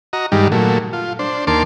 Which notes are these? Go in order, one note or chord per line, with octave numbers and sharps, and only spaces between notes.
F#4 D#5 A#5
G2 D#3 G3 G#3
A#2 F#3 A3
F4
D4 C5
D#2 A#3 A5 C6 D6